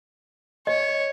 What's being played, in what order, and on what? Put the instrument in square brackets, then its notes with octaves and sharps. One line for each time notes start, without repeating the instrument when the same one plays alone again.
[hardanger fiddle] C#5 [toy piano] D#5